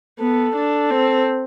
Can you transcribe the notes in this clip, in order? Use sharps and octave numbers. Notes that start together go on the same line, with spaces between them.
B3 A4
D4
C4